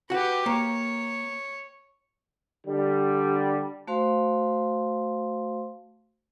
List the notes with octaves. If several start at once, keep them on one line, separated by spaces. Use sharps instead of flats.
F#4 G4 B4 F#5
A#3 C#5
D3 G3
A3 F#4 C5 F5 C6